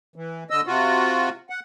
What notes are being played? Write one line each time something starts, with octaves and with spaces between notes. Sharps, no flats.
E3
D3 D#5 E6
C3 F4 F#4
F#5